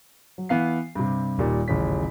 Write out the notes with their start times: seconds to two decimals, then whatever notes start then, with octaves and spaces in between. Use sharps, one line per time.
0.38 F#3
0.49 E3 B3 F5 C7
0.95 G2 C3
1.38 D#1 A#2 G3 D#4
1.68 D#1 A1 C#3 C#4 B6